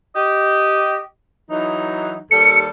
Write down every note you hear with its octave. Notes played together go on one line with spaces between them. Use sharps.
G4 D#5
E3 F#3 D#4
D#2 G3 A4 C#7